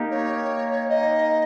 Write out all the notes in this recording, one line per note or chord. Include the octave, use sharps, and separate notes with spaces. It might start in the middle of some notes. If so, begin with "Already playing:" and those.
Already playing: A#3 D#4 G4
C#5
D#5